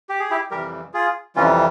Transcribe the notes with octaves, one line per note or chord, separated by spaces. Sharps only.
G4
G#4
E4 G4
F2 C3 E3 G3 G4 A#4
F4 G#4
F2 C3 E3 G3 C#4 F4